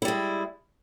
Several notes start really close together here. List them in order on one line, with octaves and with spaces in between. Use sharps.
E4 G3 G#3